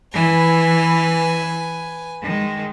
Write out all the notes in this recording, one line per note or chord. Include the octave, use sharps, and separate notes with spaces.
E3 B4 G#5
D#3 G#3